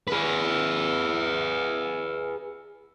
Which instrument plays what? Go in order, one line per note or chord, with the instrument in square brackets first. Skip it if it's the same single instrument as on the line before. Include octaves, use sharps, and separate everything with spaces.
[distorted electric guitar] G#4 B4